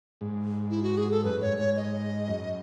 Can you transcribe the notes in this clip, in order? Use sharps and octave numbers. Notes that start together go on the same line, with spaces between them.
G#2
E4
F#4
G#4
A4
F#2 B4
G#2 C#5
G#2 C#5
D#5
F#2